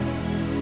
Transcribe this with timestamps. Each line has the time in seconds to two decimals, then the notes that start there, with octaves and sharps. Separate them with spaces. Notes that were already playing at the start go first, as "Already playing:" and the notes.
Already playing: E2 B2 G#3 C#4 E4
0.11 G#5